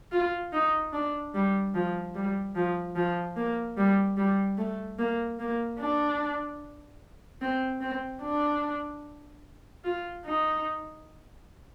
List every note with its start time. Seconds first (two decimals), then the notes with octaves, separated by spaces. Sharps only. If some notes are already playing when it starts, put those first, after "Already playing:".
0.12 F4
0.53 D#4
0.93 D4
1.34 G3
1.75 F3
2.15 G3
2.55 F3
2.96 F3
3.37 A#3
3.77 G3
4.17 G3
4.58 A3
4.99 A#3
5.39 A#3
5.80 D4
7.42 C4
7.81 C4
8.22 D4
9.84 F4
10.25 D#4